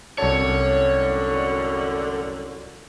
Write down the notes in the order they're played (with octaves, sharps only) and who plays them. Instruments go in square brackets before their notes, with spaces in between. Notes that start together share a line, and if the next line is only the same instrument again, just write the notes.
[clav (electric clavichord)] C2 A5 [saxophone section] F#2 A2 D3 [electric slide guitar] C#5